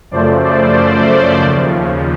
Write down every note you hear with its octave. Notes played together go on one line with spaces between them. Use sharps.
F#2 C#3 F3 A3 C5 D5
C5 D5
D#2 C#3 F3